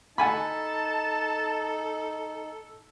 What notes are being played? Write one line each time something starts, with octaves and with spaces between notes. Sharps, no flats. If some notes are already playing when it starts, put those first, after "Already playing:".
D#4 A4 F#5 G#5 A5 B5